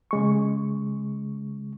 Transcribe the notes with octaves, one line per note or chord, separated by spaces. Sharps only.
C#3 G#3 C#6